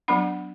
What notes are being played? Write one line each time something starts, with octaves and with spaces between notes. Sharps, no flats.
F#3 B3 D4 F#5 B5